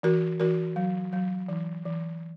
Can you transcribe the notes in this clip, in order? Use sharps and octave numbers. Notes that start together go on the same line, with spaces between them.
E3 F#4 A#4
E3 F#4 A#4
F#3
F#3
E3
E3